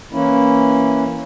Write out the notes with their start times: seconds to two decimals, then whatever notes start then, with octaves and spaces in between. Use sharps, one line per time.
0.13 E3 A#3 C#4 E4